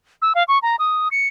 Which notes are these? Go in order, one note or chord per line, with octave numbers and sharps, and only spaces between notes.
E6
F5
C#6
A#5
D#6
C#7